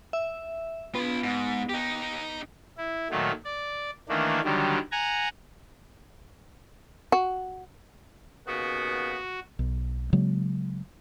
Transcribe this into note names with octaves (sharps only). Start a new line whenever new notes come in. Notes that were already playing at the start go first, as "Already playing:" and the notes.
E5
B3 F4 B5
G#2
D#4 G4
E4
A#2 D#3 F#3 A3
D5
D#3 E3 A3 A#3 D4
D3 D#3 F#3 G3
F#5 G#5 A#5
F#4
D#2 C#3 B3 F#4
B1
C#3 F#3 G#3 A#3